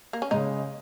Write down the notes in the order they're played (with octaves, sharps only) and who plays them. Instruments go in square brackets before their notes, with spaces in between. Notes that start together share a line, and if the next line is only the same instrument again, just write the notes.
[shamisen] A#3
C#4
[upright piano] C#3 G#3 [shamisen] D#4